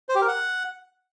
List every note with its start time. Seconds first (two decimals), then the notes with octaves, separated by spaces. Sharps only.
0.09 C5
0.15 G4
0.21 A#4
0.28 F#5